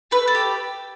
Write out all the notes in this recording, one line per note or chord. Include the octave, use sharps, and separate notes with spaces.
A3 B4
A4
G4